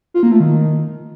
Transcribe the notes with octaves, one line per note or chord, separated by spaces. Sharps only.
F4
A#3
A3
D#3